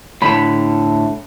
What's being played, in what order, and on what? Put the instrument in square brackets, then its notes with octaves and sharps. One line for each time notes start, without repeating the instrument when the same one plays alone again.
[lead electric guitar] A2 D3 [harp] B5 E7